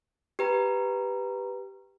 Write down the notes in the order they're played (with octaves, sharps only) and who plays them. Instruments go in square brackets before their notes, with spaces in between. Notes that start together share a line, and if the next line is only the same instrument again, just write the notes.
[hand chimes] G4 B4 A#5